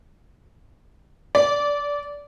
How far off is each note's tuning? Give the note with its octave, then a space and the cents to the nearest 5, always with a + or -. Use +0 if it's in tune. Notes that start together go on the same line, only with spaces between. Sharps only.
D5 -20